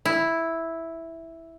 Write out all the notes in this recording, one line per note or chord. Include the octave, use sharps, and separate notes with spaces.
E4